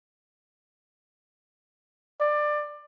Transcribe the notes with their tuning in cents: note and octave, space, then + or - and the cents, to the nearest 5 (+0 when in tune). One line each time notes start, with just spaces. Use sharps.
D5 +20